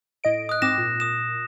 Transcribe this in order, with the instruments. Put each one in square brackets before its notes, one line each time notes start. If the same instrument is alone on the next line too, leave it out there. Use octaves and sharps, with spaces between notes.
[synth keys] A2 D#5 D7
[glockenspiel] D#6 F#6
[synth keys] G#2 C4 D6 [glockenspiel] A#6 E7
[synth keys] A#2
[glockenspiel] D#6 E7